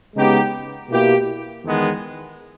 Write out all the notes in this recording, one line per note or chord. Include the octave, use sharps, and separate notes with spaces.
C#3 G#3 B3 D#4 G4
B2 A#3 E4 G4
E2 D#3 G#3 B3